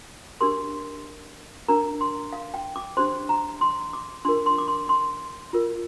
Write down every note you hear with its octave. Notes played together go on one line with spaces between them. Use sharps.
D4 G4 A#4 C6
D4 A#4 A#5
C6
F5
G5
D6
D4 G4 C5 C6
A#5
C6
D6
D4 F4 A#4 C6
C6
D6
C6
C6
F4 A#4